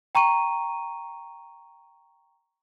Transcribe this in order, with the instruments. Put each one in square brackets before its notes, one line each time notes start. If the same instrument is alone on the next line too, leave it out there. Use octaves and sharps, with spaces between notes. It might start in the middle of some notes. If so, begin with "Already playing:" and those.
[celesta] G5 A#5 C#6 D#7